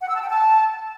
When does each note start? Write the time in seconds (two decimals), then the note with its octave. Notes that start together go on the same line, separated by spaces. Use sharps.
0.01 F#5
0.08 E6
0.15 A5
0.22 G5
0.29 A5